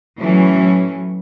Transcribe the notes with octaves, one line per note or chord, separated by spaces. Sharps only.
A2 E3 F#3 C#4